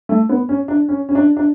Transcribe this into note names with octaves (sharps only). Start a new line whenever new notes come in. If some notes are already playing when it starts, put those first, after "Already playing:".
A3
B3
C#4
D4
C#4
C#4
D4
D4